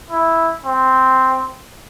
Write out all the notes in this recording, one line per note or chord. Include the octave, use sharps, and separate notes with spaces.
E4
C4